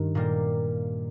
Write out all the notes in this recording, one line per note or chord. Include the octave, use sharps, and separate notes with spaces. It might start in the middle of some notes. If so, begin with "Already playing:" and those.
Already playing: G2 D#3
A#2 G3 A#3